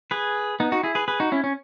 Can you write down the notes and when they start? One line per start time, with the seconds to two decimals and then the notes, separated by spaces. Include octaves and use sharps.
0.11 G#4 B4
0.60 B3 D#4
0.72 D#4 F#4
0.83 E4 G#4
0.95 G#4 B4
1.08 G#4 B4
1.20 D#4 F#4
1.32 C#4 E4
1.44 C#4